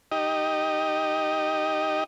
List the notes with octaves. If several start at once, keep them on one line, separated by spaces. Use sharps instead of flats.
D#4 G4 D#5